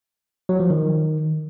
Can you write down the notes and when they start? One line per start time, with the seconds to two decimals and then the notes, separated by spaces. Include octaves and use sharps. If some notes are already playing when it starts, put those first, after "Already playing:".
0.49 F#3
0.60 F3
0.70 D#3